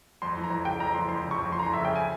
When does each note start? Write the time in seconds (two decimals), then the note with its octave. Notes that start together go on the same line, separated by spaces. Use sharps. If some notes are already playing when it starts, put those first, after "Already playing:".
0.22 F2 C6
0.37 E3
0.44 A#5
0.50 F2
0.65 C#3 G5
0.80 F2 A#5
0.94 E3 C6
1.08 F2 C6
1.24 C#3
1.31 C#6
1.38 F2
1.52 E3 C6
1.59 A#5
1.63 F2 C6
1.73 E5
1.81 C#3 G5
1.95 G#5